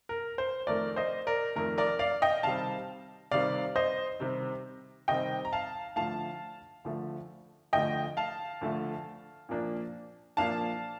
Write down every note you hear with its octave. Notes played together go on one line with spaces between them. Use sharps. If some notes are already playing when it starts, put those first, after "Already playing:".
A#4
C5
F2 D#3 A3 A#4 D5
C5 D#5
A#4 D5
F2 D#3 A3 A#4
A#4 D5
D5 F5
D#5 G5
C3 D#3 G3 C4 F5 A5
C3 D#3 G3 C4 D5 F5
C5 D#5
C3 D#3 G3 C4
C3 D#3 G3 C4 D#5 G5
A#5
F5 A5
D2 D3 F3 A3 F5 A5
D2 D3 F3 A3
D2 D3 F3 A3 D#5 G5
F5 A5
D2 D3 F3 A3
A#2 F3 A#3 D4
A#2 F3 A#3 D4 F5 A5